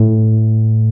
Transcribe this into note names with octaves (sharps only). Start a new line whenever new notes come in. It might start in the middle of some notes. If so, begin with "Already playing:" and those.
Already playing: A2